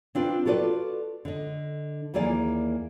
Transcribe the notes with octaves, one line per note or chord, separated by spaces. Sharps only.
C4 D4 F4 B4
F4 F#4 A4 B4 D5
D3 D#5
D#2 E3 A#3 G#4 D5 G#5